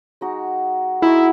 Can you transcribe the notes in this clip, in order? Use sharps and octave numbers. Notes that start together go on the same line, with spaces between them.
G#3 D#4 F#4
G#3 D#4 E4 F#4